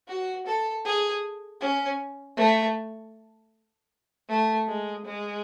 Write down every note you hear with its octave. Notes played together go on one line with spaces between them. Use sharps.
F#4
A4
G#4
C#4
A3
A3
G#3
G#3